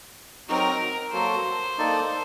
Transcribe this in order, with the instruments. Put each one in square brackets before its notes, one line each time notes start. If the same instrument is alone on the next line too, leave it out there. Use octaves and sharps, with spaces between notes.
[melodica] F#3 C4 D#4 F#4 [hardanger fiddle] A#4
[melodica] F#3 A#3 F#4 A4 [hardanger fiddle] C5
[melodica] A#3 D#4 A4 D5